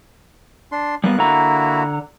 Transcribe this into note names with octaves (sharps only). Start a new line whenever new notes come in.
D4 C6
G3 A#3 B3 F#6
D3 A#3 E4 F#4 A#5